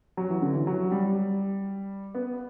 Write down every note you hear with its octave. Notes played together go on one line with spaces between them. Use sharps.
F#3
E3
D3
E3
F#3
G3
B3